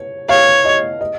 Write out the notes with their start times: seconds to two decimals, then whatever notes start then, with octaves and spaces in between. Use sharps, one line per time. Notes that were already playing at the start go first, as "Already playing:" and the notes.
Already playing: C#5
0.29 C#5 F5
0.65 D#5
1.01 D#5